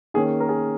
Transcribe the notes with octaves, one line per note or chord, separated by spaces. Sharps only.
D#3 A#3 C#4 G#4
A#4
G#4